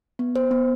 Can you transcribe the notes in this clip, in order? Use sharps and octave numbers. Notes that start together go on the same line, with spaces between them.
B3
C5
B3